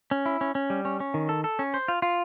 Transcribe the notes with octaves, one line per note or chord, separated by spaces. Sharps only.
C#4
E4
C#4
C#4
G3
C#4
C#4
D#3
A4
A4
C#4
C5
F4
F4